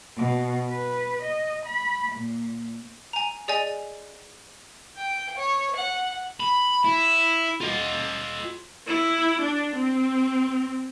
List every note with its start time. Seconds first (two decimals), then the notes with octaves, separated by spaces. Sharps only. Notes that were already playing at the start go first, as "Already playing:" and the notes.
0.18 B2
0.69 B4
1.23 D#5
1.66 B5
2.13 A#2
3.13 G#5 A#5
3.48 G#4 D5 D#5 G#5
4.97 G5
5.37 C#5
5.76 F#5
6.40 B5
6.84 E4
7.61 F4 D#5
8.87 E4
9.41 D4
9.75 C4